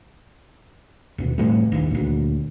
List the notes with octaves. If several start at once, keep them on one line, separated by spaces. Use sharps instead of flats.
D#2 B2
F1 A2 G3 A3
A#1 D#2
D2 A#2